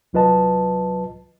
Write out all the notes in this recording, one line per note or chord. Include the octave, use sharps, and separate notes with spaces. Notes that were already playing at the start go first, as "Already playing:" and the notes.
C2 F#3 F4 B4 D#5 A5